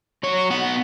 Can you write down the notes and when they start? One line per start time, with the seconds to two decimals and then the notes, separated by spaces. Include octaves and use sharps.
0.23 F#3 C#5
0.50 B3 F#5